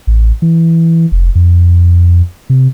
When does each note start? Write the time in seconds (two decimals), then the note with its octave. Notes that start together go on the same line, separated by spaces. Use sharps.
0.07 A1
0.42 E3
1.12 F1
1.35 F2
2.50 C3